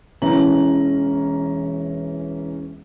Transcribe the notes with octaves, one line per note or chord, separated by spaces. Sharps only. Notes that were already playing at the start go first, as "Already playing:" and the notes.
E1 E3 C#4 A#5 F#7